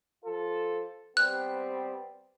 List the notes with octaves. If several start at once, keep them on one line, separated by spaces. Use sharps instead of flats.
F3 F4 A4
G3 B3 C4 F#6